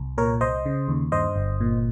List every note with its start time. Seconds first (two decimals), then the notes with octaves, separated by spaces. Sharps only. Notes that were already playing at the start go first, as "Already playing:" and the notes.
Already playing: C2
0.18 A#2 A#4 C#5
0.41 C2 C5 D#5
0.66 C#3
0.88 D#2
1.12 G2 C5 D#5
1.36 G1
1.61 A#2